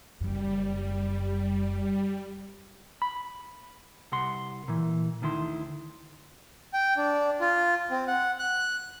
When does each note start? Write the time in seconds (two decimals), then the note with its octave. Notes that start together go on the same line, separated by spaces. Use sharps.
0.21 F#1 F#2 G3
3.02 B5
4.12 C2 F#5 C6
4.68 A#2 E3
5.22 D2 D#3 E4 C6
6.74 G5
6.97 D4
7.41 F4
7.90 C4
8.07 F#5
8.39 F#6